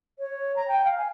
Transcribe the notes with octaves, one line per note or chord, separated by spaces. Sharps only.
C#5
A#5
G5
F5
G#5